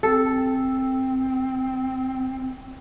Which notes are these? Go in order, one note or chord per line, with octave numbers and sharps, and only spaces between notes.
C4 A4